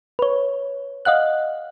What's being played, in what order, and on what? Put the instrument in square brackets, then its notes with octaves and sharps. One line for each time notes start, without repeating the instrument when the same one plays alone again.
[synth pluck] B4 C#5
D#5 F5 F#5 F#6